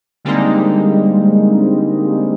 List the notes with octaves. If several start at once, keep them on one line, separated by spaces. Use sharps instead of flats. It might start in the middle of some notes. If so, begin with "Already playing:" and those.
D3 G3 G#3 A#3 C4 D#4